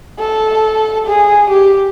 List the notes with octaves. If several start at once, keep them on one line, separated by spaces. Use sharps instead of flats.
A4
G#4
G4